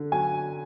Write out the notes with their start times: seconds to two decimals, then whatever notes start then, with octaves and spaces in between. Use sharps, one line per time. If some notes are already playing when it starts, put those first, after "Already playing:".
Already playing: D3
0.12 F#3 G#5